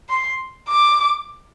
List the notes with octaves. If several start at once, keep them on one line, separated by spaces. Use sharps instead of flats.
C6
D6